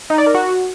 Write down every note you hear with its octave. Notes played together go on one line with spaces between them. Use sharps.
D#4
D5
A#4
F#4